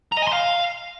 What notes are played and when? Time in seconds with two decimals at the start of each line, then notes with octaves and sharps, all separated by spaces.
0.12 A#5
0.17 D#5
0.22 G#5
0.27 C6
0.33 F5